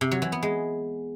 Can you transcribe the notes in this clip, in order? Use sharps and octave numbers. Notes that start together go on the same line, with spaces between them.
C3
F#3
E3
B3
G#3